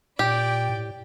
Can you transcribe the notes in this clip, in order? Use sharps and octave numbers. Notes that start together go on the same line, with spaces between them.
A#2 G4 D5 G5
A2